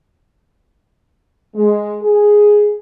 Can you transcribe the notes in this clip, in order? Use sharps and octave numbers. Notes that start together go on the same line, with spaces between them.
G#3
G#4